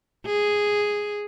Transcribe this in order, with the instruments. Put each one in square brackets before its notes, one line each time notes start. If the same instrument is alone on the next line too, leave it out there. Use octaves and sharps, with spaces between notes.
[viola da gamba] G#4